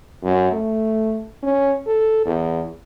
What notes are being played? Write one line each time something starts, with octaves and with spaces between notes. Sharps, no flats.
F#2
A3
C#4
A4
E2